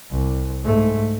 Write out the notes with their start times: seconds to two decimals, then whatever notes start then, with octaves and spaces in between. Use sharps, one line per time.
0.11 C2
0.63 G#2 A3